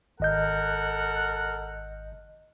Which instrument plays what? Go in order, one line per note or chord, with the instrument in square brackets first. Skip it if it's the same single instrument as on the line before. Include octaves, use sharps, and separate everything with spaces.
[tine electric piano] G#1 D#5 G6 [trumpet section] A4 A#4 F#5